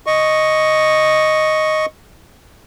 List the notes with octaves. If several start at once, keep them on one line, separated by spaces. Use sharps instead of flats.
D#5 C#6